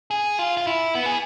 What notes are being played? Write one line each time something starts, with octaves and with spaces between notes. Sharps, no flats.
G#4
F4
F4
E4
B3
G#4